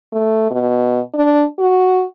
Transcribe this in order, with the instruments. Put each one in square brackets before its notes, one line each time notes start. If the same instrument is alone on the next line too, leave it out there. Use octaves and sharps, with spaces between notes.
[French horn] A3
B2
D4
F#4